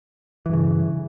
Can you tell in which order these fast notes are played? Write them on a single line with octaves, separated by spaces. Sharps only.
E3 G2 C#3